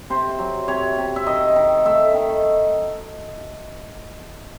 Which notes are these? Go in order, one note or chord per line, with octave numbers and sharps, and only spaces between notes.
C3 C5
F#3
C3 C#5
C3
E5
D#3 D#5
D#3
A3 E5
D#3